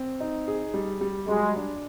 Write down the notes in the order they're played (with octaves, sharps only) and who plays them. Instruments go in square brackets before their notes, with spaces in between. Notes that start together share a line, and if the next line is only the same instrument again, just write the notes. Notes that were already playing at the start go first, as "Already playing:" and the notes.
Already playing: [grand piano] C4
D#4
G#4
G3
G3
[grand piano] F#3 [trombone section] G#3
[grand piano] D4